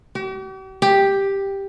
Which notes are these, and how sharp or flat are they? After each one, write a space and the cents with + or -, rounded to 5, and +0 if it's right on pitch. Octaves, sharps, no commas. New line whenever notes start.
G4 -45
G4 +5